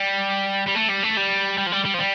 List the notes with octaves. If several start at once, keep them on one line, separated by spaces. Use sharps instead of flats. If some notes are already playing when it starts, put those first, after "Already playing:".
Already playing: G3
G3
A3
G3
A3
G3
G3
F3
G3
G3
F3
G3